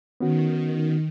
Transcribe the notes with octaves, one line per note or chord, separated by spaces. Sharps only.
D#3 B3 C#4 F#4